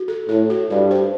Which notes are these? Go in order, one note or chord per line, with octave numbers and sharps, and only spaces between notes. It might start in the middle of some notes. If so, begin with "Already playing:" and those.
Already playing: F#4
A4
A2 A4
F#4
G2 F#4
C5